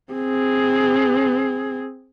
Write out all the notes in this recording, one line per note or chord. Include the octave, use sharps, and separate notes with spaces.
C4 G#4